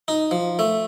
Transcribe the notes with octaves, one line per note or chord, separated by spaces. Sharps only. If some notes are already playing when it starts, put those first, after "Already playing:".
D#4
F3
A3